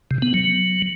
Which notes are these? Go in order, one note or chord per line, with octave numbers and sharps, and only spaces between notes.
C3
B3
F#3